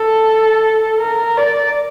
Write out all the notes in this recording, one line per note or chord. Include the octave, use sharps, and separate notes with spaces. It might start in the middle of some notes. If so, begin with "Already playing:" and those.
Already playing: A4
A#4
D5